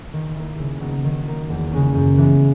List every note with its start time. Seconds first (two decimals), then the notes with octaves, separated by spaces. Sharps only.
0.13 D#3
0.36 A#3 E4
0.59 C#3
0.80 F#3 B3 D#4
1.04 D#3
1.27 A#3 D#4
1.50 E2
1.73 C#3 G#3 C#4
1.95 F#2
2.18 E3 G#3 B3